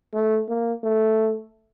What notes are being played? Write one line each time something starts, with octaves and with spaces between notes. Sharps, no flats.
A3
A#3
A3